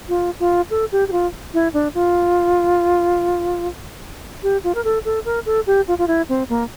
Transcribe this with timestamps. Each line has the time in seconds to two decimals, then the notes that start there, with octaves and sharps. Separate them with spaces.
0.09 F4
0.40 F4
0.71 A4
0.92 G4
1.08 G4
1.12 F4
1.54 E4
1.74 D4
1.94 F4
4.43 G4
4.64 F4
4.75 A#4
4.84 A4
5.05 A4
5.25 A#4
5.46 A4
5.67 G4
5.88 F4
5.98 F4
6.08 E4
6.29 C4
6.49 A#3